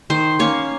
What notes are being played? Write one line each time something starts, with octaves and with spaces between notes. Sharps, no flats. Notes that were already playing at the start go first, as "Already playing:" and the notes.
D#3 C5
A#3 C#4 C#5